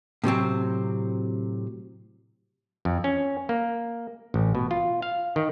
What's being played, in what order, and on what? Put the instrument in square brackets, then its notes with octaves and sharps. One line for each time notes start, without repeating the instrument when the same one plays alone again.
[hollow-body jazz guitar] A2 C3 F#3 C4
[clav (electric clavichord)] F2
C#4
A#3
A1
B2
F4
F5
D#3